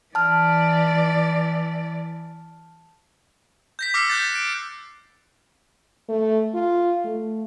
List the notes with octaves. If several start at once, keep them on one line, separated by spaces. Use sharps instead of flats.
E3 D5 A5 F6
G6 A#6 B6
D6 E6 F6 A#6 C7 C#7
F#6 G6 A6
D7
A3
F4
A3